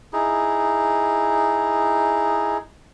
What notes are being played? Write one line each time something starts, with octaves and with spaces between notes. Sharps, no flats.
D#4 E4 G#4